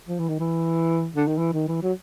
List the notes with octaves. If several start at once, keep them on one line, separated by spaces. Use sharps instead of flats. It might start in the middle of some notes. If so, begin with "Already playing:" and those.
F3
E3
D#3
E3
D3
D#3
E3
D#3
E3
F#3